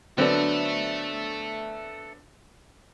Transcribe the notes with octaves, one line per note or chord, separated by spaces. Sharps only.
D3 F#3 B3 C4 D4 A4 E5